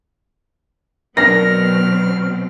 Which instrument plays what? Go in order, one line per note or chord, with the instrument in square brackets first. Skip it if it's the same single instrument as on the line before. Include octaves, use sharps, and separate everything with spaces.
[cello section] B2 F#3 C4 [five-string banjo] B3 D4 A#4 [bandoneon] F6 [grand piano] A#6